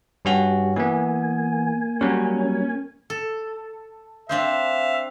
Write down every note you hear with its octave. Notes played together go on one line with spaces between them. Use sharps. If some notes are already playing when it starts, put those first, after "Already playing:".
G2 C#4 F#4 G4
E3 A#3 B3 G#5
F#3 G3 C#4
A4
C4 D4 C5 E5 F5